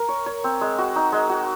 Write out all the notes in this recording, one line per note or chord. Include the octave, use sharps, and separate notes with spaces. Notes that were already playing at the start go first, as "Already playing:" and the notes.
Already playing: A#4
C#5
C#5
C4
G#3
F#4
D#4
G#3
F#4